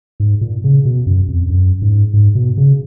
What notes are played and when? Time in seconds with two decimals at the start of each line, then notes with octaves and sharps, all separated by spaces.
0.20 G#2
0.41 A#2
0.64 C#3
0.85 B2
1.06 F#2
1.28 F2
1.50 F#2
1.82 G#2
2.14 G#2
2.35 B2
2.57 C#3